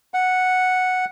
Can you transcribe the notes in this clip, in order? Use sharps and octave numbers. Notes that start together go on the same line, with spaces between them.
F#5